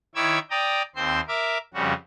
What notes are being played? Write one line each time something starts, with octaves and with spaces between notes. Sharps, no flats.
D#3 E4 C#5 D6 E6 G#6
D5 G5 A#5 D#6
D#2 C4 C5 C6
A#4 E5 D6
F2 C#3 G3 F#4